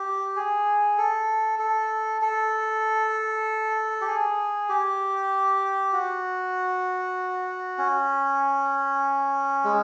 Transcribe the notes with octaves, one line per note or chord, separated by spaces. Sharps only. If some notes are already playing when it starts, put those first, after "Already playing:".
Already playing: G4
G#4
A4
A4
A4
G4
G#4
G4
F#4
C#4
G#3